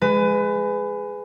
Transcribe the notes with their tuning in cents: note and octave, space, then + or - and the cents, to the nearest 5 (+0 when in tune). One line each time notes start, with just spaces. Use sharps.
G#3 +0 B4 +25